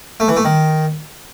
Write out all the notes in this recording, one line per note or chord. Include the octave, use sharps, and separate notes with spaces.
A3
E3
A3
D#3